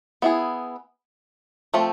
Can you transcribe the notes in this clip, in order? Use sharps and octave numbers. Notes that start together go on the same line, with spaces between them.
B3 E4 G#4
F3 A3 C4